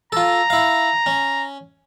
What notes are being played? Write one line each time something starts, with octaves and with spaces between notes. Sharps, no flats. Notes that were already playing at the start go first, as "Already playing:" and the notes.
F4 A4 A#5
E4 F5
C#4